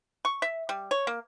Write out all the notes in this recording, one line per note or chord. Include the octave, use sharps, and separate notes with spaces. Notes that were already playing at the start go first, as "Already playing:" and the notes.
C#6
E5
G3
C#5
A#3